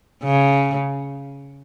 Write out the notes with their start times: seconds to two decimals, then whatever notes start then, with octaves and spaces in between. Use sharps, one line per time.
0.23 C#3